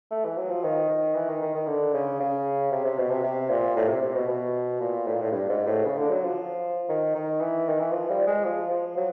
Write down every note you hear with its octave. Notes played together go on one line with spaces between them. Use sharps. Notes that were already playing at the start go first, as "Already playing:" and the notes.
A3
E3
F#3
F3
D#3
D#3
E3
D#3
D#3
D#3
D3
C#3
C#3
C3
C3
B2
C3
C3
A#2
A2
C3
C3
B2
B2
A#2
A2
A#2
A2
G2
G#2
A2
C#3
D3
F#3
F3
D#3
D#3
E3
D#3
E3
F3
G3
G#3
F3
F3
F#3